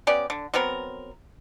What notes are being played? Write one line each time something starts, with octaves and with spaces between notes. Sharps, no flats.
B3 C#4 G4 D5
D3
F#3 B3 C4 A#4